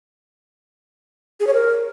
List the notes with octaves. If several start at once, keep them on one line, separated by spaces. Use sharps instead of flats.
G#4
C#5
A#4